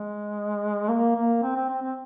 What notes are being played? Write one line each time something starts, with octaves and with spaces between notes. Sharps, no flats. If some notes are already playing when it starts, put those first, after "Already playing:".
Already playing: G#3
A#3
A#3
C4
C4
C4
C4